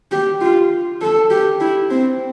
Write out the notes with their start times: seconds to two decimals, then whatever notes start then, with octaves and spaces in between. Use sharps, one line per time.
0.12 G4
0.41 F4
1.01 A4
1.31 G4
1.61 E4
1.91 C4